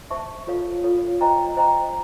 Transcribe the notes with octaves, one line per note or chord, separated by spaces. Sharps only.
C5 E5 A5 C#6
F4 A4 C#5 F5
F4 A4 C#5 F5
C5 D#5 G5 A#5
C5 D#5 G5 A#5